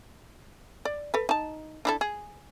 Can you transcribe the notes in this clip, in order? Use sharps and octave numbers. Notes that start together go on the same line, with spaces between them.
D5
A4 B4
D#4 A5
D4 E4 A4
G#4